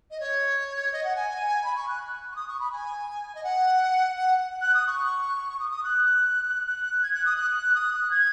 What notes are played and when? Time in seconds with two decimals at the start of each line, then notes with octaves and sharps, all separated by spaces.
0.11 D#5
0.20 C#5
0.92 D#5
1.03 F#5
1.15 G#5
1.64 B5
1.75 C#6
1.87 F#6
2.31 C#6
2.35 D#6
2.47 C#6
2.59 B5
2.72 G#5
3.35 D#5
3.43 F#5
4.15 F#5
4.61 F#6
4.74 D#6
4.86 C#6
5.59 D#6
5.70 D#6
5.83 F#6
6.66 F#6
7.02 G#6
7.14 F#6
7.25 D#6
7.36 F#6
7.74 D#6
7.93 F#6
8.10 G#6